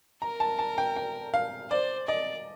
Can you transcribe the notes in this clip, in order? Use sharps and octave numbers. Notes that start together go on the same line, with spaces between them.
A#4 A#5
A5
A5
G5
G5
F5
C5 D5
D5 D#5